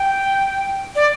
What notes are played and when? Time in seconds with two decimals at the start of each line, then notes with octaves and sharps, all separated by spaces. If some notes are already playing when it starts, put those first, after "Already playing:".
Already playing: G5
0.96 D5